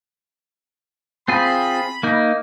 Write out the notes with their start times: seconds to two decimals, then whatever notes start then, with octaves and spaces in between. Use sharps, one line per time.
1.28 C4 F4 G#4 B5
2.03 A#3 D#4